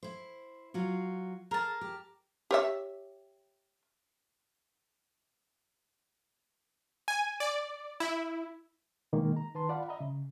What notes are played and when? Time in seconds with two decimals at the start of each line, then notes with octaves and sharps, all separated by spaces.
0.03 E4 C5
0.74 F#3 F4 F#4
1.51 G#4 A#4 A5
1.81 G4
2.51 G4 C#5 E5
7.08 G#5
7.40 D5
8.00 E4
9.13 B2 D#3 G#3 A#3
9.37 A#5
9.55 D#3 B4 A5 C6
9.69 F4 D5 F5 F#5 B5
9.88 D#5 E5 A#5 B5
10.00 C#3